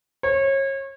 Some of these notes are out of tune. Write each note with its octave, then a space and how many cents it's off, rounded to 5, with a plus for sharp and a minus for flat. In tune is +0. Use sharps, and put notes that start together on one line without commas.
C#5 -30